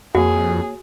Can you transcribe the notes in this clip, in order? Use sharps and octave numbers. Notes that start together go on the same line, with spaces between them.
F2 A#3 F#4 G#4 C#5 F#5